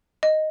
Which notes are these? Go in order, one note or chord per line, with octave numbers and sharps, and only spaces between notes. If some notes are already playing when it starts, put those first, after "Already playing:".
D#5